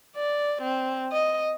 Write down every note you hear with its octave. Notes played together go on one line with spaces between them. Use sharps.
D5
C4
D#5